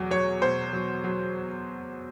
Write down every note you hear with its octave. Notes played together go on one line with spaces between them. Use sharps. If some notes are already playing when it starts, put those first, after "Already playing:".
Already playing: E2 F#3
F#3 C#5
B2 C5
F#3
F#3